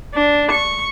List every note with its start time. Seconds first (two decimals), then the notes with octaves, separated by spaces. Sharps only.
0.14 D4
0.51 C#6